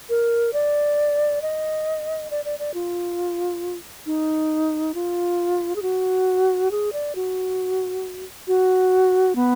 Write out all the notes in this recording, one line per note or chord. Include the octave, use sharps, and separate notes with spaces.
A#4
D5
D#5
D5
D5
D5
F4
D#4
F4
G#4
F#4
G#4
D5
F#4
F#4
B3